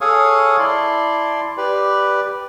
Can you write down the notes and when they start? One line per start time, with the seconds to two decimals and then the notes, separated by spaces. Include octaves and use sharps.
0.01 G#4 A4 C#5 F5 C#6 D#6
0.59 E4 D5 A5 C6
1.57 G4 B4 D5